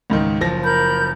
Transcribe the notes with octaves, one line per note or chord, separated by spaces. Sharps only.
C#2 G#2 D#3
F#1 F3 A#6
A#4 B5 G6